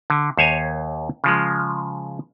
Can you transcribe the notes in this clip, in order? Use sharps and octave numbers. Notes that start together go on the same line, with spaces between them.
D3
D#2 C5 C#5 G#5 A#5
C#3 F3 G#3